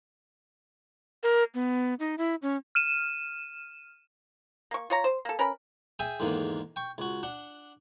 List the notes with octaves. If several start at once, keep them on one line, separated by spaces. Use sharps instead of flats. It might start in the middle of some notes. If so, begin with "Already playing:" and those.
A#4
B3
D#4
E4
C#4
F6 D#7 E7
A#3 C#6
F4 C#5 A#5
C5
A#3 A4
C#4 A#4 B4 B5
G#4 E5 G5 G#5
E2 G#2 D3 D#3 A#3
G5 C#6
C#2 F#4
D4 F#5